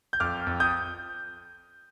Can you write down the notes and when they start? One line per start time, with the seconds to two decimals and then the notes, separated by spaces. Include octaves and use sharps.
0.13 G6
0.20 F2 D6 F6
0.47 F2
0.60 D#6 G6